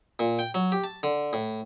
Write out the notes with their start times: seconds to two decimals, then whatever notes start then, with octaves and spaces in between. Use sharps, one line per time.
0.19 A#2
0.39 G5
0.54 F#3
0.72 G4
0.84 A5
1.03 D3
1.33 A2